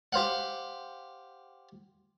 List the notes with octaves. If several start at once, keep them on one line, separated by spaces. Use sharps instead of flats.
G4 C5 F5 F#5